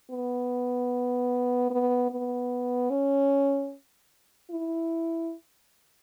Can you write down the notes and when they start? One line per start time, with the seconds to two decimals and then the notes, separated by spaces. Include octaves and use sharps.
0.11 B3
1.70 B3
2.10 B3
2.90 C#4
4.51 E4